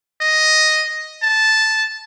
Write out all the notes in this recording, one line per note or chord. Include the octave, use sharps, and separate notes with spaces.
D#5
A5